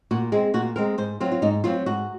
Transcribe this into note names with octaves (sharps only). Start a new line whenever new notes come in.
A#2 F#4
G#3 C4 G#4
A#2 F#4
G#3 C4 A#4
G#2 C5
F#3 C4 F4
F4
G#2 D#4
F#3 C4 F4
G#2 F#4